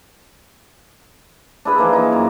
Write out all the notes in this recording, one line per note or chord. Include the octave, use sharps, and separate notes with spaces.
D4 E4 G#4 B4
E3 F3 A#3 D#4
D#4
F#2